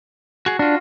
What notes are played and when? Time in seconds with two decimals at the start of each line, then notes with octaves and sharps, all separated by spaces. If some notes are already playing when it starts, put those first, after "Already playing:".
0.46 F#4 G#4
0.59 D4 F4 F#4